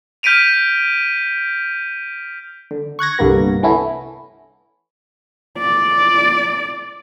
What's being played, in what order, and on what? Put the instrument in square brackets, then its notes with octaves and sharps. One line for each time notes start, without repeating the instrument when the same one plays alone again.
[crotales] F6 G6 B6 D7 D#7 F7
[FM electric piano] D3
C#6 F#6 G#6 A#6
C2 G2 D3 A#3 B3 A#6
E3 A3 B3 C#4 E4
[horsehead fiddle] D5